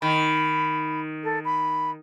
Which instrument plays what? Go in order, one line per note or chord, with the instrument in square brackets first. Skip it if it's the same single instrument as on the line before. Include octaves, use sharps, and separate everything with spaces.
[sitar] D#3 [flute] B5
[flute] A4
B5